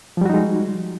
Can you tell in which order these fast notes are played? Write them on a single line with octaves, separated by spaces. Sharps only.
F3 G3 F#4 D#4 G#3